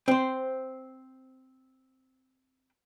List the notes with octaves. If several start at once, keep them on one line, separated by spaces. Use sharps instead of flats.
C4 C5